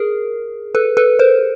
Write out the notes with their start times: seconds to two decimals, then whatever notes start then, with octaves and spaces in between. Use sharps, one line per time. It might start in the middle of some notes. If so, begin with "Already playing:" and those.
Already playing: G#4 A#4
0.75 A4 B4
0.97 A4 B4
1.19 A#4 C5